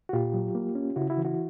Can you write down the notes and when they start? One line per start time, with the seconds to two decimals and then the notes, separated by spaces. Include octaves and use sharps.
0.09 F#4
0.13 A#2 F4 G4
0.34 F#3
0.55 A#3
0.75 C#4
0.96 C#3 E4 F#4
1.10 E4 F#4
1.17 E3
1.25 E4 F#4